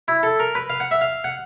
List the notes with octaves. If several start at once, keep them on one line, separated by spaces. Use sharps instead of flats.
E4
A4
A#4
B4
F5
F#5
E5
F5
F#5